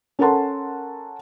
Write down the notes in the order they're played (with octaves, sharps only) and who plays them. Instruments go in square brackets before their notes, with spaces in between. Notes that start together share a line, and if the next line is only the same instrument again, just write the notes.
[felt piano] C#4 A4 A#4 F#5 A5 C6